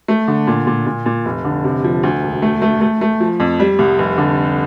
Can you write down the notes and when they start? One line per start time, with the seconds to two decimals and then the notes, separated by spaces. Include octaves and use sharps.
0.08 A3
0.28 D3
0.47 A#2
0.67 A#2
0.86 A#2
1.06 A#2
1.25 F1
1.45 D3
1.64 C3
1.84 F3
2.03 D2
2.23 E1
2.42 A3
2.62 A3
2.81 A3
3.01 A3
3.20 F3
3.40 F2
3.60 G3
3.79 C2
3.99 F1
4.18 D3